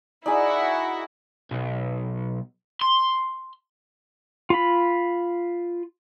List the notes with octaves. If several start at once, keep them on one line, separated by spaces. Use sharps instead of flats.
D#4 E4 F#4 G#4 D5
B1
C6
F4 B5